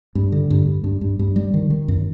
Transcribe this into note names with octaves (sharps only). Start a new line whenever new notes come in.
G2
D3
G2
G2
G2
G2
G2
G3
D#3
D#3
F#2